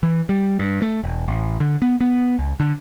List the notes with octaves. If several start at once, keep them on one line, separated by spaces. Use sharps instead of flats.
E3
G3
G2
A3
E1
A1
D3
B3
B3
C#2
D3